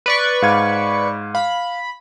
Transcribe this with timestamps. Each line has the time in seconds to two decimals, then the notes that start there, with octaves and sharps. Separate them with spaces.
0.06 B4 D5 C#6
0.42 G#2 F5 G#6
1.35 F5 B5